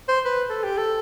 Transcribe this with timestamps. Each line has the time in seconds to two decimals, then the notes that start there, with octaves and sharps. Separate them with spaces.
0.08 C5
0.25 B4
0.50 A4
0.64 G4
0.78 A4